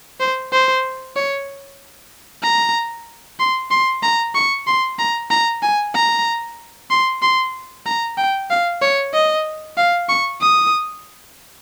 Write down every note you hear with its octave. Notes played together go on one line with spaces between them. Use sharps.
C5
C5
C#5
A#5
C6
C6
A#5
C#6
C6
A#5
A#5
G#5
A#5
C6
C6
A#5
G5
F5
C#5
D#5
F5
C#6
D#6